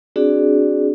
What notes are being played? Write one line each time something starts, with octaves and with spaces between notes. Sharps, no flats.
C4 D4 F#4 G#4 D5